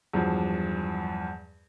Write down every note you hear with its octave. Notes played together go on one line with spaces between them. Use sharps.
E2 G2 F3 F#3